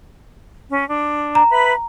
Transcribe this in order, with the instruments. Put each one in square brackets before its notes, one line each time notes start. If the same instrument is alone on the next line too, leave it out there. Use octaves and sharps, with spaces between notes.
[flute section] C#4
D4
[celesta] A#5
[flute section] B4 E5 B5